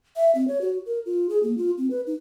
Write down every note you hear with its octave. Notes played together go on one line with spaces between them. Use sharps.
E5
C4
C#5
F#4
A#4
F4
G#4
A#3
F4
C4
B4
D#4